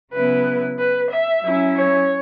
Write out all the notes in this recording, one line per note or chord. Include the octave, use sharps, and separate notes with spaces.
C#3 F#3 B3 E4 B4
B4
E5
F#3 C#4 E4
C#5